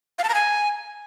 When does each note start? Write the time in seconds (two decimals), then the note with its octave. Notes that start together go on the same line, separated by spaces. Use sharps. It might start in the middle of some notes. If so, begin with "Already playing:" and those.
0.19 F5
0.24 A5
0.29 A#5
0.34 G#5